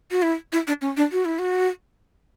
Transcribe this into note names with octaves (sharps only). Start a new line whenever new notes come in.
F#4
E4
E4
D4
C#4
D4
F#4
E4
F#4